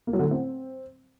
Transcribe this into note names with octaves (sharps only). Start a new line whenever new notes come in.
A#3
F#3
D3
A2
C4